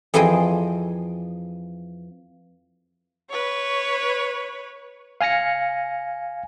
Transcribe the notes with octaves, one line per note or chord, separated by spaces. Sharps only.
F2 E3 F3 G#4 D#5 G5
B4 C#5
F5 G#5 F6 A#6 C#7